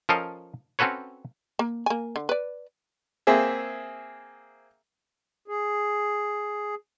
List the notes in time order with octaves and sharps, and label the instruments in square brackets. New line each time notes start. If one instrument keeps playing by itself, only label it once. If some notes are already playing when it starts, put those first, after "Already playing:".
[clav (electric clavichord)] F3 C#4 A4 A#4 D#5 F5
C4 C#4 F#4 A4 B4 C#5
[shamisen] A#3
A#3 G#5
D3
B4 D5
[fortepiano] A#3 C4 G#4 E5
[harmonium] G#4